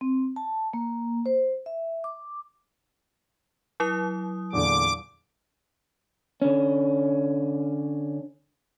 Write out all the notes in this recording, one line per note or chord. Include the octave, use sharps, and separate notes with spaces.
C4
A5
A#3
C5
E5
D6
F#3 E4 D#6
E2 A#2 D3 D6
D3 C#4